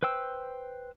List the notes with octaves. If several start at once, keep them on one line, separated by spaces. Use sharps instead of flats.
B4 C5 G5 E6